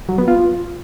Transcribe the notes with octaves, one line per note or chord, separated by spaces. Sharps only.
F#3
B3
F4